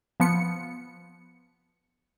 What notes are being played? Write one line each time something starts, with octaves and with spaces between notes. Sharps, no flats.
F3 B3 C#7